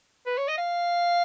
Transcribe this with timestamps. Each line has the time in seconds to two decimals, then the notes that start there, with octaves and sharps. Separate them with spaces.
0.26 B4
0.38 C#5
0.48 D#5
0.58 F5